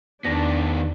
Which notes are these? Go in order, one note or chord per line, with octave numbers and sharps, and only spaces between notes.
E2 D#3 B3 D4 A#6